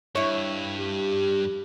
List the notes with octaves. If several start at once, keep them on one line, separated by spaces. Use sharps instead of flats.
G2 E4 C#5
G4